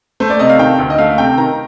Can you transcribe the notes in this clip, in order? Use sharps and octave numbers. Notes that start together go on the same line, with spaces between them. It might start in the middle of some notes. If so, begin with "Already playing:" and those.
A3 C5
D5
C3 D#5
F5
D#3 G5
D2
D#5
A3 F5
C3 G5
D#3 A#5